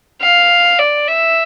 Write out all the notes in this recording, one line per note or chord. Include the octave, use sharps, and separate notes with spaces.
F5
D5
E5